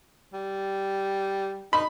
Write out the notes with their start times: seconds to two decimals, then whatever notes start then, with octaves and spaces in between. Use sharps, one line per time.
0.33 G3
1.73 D#4 B5